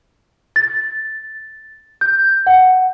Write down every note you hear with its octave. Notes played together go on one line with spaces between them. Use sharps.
A6
G6
F#5